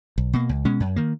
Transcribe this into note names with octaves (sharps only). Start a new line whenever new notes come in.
B1
B2 A#3
C#2
B2 G#3 C#4
F#2
D#3 A#3